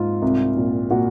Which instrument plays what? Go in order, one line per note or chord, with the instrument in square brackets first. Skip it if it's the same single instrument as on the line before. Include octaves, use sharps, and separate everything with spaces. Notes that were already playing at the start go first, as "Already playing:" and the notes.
Already playing: [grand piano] G#2 F4
C2
A#2
A#2 F#4